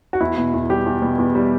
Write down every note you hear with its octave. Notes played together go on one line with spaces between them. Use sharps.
F#4
E2 E4
B2
E2
G3 G4
E2
B2
E2
G3